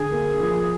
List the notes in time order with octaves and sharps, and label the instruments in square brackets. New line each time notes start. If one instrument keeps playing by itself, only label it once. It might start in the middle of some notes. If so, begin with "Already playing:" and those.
Already playing: [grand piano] D3 [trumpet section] G#4
[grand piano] A#3
F3